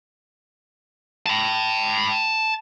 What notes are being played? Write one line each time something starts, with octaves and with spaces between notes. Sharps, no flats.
A5 B5